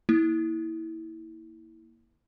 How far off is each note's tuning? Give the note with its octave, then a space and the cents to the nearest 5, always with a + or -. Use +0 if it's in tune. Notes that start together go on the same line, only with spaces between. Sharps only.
A#3 +0 E4 -20